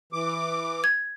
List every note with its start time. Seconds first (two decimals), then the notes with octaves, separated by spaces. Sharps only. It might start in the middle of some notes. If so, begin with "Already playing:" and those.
0.13 E3 D6
0.84 G#6